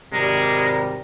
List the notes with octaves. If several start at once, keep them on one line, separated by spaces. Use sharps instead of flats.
G#1 C3 G3 G#3 A#4